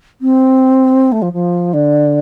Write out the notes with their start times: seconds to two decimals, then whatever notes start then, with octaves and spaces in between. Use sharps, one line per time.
0.21 C4
1.12 A3
1.22 F3
1.33 F3
1.73 D3